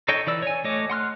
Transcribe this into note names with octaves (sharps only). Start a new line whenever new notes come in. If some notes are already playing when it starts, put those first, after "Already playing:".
D#4 A4 C#5 D#5 G5
E3 D5 E6
C#5 G#5
A3 F#4 C#5 D#5 D6
F#5 C6 F6 F#6